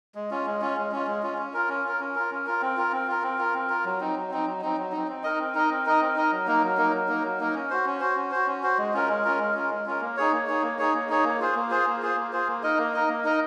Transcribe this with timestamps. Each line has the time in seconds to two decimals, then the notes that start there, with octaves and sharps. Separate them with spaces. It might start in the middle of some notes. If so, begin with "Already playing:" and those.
0.15 G#3
0.31 C#4 F4
0.46 G#3
0.61 C#4 F4
0.77 G#3
0.91 C#4 F4
1.07 G#3
1.23 C#4 F4
1.38 C#4
1.54 F4 A#4
1.69 C#4
1.84 F4 A#4
2.00 C#4
2.15 F4 A#4
2.31 C#4
2.46 F4 A#4
2.62 C4
2.77 F4 A#4
2.92 C4
3.07 F4 A#4
3.23 C4
3.38 F4 A#4
3.54 C4
3.69 F4 A#4
3.85 F#3
4.00 C4 D#4
4.16 F#3
4.31 C4 D#4
4.46 F#3
4.61 C4 D#4
4.77 F#3
4.92 C4 D#4
5.08 C4
5.23 D#4 A#4 D#5
5.39 C4
5.54 D#4 A#4 D#5
5.70 C4
5.86 D#4 A#4 D#5
6.01 C4
6.16 D#4 A#4 D#5
6.31 F#3
6.46 A#3 D#4 A#4
6.62 F#3
6.77 A#3 D#4 A#4
6.93 F#3
7.08 A#3 D#4 A#4
7.24 F#3
7.39 A#3 D#4 A#4
7.54 C#4
7.70 F#4 C5
7.85 C#4
8.00 F#4 C5
8.16 C#4
8.31 F#4 C5
8.47 C#4
8.63 F#4 C5
8.78 G#3
8.93 C#4 F4 A#4
9.08 G#3
9.24 C#4 F4 A#4
9.39 G#3
9.54 C#4 F4 A#4
9.70 G#3
9.86 C#4 F4 A#4
10.01 A#3
10.17 D#4 G#4 C#5
10.32 A#3
10.47 D#4 G#4 C#5
10.63 A#3
10.79 D#4 G#4 C#5
10.94 A#3
11.09 D#4 G#4 C#5
11.24 A#3
11.40 F4 G#4 C5
11.56 A#3
11.70 F4 G#4 C5
11.87 A#3
12.02 F4 G#4 C5
12.16 A#3
12.33 F4 G#4 C5
12.47 A#3
12.63 D#4 A#4 D#5
12.78 A#3
12.94 D#4 A#4 D#5
13.09 A#3
13.25 D#4 A#4 D#5